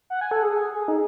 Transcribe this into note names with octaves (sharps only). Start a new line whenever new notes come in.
F#5
G#5
A4
G#4
G#4
G#4
D#4